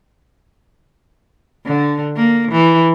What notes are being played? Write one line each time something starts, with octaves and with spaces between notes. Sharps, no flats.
D3
A#3
E3